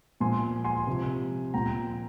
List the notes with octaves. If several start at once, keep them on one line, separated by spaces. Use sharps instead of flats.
A#2 F3 G#5 C6
G#5 C6
C3 F3
A#2 F3 G5 A#5